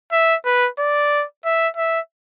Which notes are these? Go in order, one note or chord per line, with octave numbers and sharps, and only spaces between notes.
E5
B4
D5
E5
E5